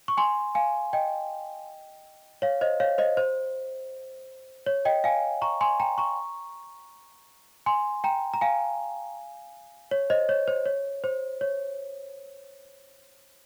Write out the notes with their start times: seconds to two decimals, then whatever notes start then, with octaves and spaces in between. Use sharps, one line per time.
0.08 C#6
0.17 G#5 C6
0.55 F5 G#5
0.93 D#5 G5
2.42 C#5 F5
2.61 C5 D#5
2.80 C#5 F5
2.98 C5 D#5
3.17 C5
4.66 C#5
4.85 D#5 G5
5.04 F5 G#5
5.42 A#5 C#6
5.61 G#5 C6
5.80 G5 A#5
5.98 A#5 C#6
7.66 G#5 C6
8.04 G5 A#5
8.34 A#5
8.41 F5 G#5
9.91 C#5
10.10 C5 D#5
10.29 C#5
10.48 C5
10.66 C#5
11.04 C5
11.41 C#5